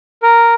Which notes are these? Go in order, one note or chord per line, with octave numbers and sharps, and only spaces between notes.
A#4